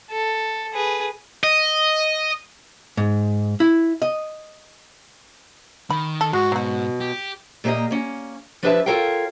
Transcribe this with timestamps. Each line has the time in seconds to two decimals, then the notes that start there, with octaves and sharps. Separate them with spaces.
0.11 A4
0.74 G#4 B4
1.44 D#5
2.97 G#2
3.60 E4
4.02 D#5
5.90 D#3 B5
6.21 A4
6.33 G#2 G#3 F#4
6.52 B2 F#3 F#4
7.01 G4
7.64 A#2 A#3 G4 C5 D#5
7.91 A#3 C#4
8.63 F3 D4 G4 B4 E5 A5
8.86 F4 A4 A#4 C#5 F5 G5